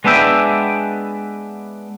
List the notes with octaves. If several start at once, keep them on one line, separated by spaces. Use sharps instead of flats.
G#3 B3 D4 B4 E5 G5